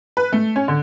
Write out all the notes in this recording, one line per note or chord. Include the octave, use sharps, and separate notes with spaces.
B4
A3
C#4
D3